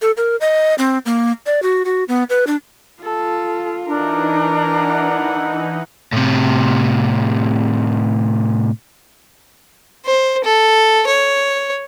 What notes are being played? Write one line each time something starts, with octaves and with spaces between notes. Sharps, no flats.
A4
A#4
D#5
C4
A#3
D5
F#4
F#4
B3
B4
D4
F4 A4
E3 D4 D#4 A#4
E4 F#5
A2 C3
C5
A4
C#5